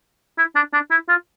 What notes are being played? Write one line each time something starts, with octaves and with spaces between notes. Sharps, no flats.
E4
D4
D4
E4
F4